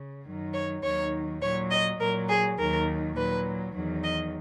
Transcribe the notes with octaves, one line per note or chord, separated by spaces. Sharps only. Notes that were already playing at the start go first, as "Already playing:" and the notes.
Already playing: C#3
F#2 D#3 F#3
C#5
D#2 D#3 F#3 C#5
A#2 F#3 C#5
D#5
A#2 F#3 A#4
G#4
D#2 D#3 F#3 A#4
A#2 F#3 B4
E2 D#3 F#3
D#5